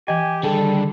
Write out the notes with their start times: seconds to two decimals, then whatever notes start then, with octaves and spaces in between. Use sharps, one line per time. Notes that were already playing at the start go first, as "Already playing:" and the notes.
0.08 E3 G4 D#5 G#5
0.43 D3 D#3 G3 G#4 A4 G5